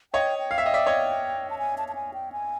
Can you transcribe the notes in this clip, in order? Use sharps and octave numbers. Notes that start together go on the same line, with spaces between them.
C#5 D#5 G5
G5
F5
E5
D#5 G5
D5 E5
C#5 D#5
A5
G#5
A5
A5
G#5
G5
G#5